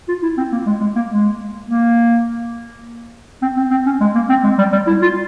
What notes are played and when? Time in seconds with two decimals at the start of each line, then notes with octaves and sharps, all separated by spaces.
0.08 F4
0.23 E4
0.37 C4
0.52 A#3
0.66 G#3
0.81 G#3
0.96 A#3
1.10 G#3
1.69 A#3
3.42 C4
3.57 C4
3.71 C4
3.86 C#4
4.01 G#3
4.15 A#3
4.29 C4
4.43 G#3
4.58 G3
4.72 G3
4.87 E4
5.02 F4